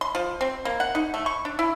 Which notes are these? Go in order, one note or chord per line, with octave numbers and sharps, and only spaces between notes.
C6
F3
C4
A#3
F#5
D#4
A3
C#6
D4
E4